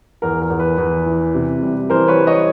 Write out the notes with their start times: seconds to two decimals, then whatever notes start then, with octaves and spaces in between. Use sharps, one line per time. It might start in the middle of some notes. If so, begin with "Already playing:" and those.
0.22 E2 A#4
0.42 A#4
0.50 E2
0.60 B4
0.78 E2
1.06 E3
1.35 C3
1.63 G3
1.90 E3 A#4 C5
2.08 B4 C#5
2.18 G3
2.27 C#5 D#5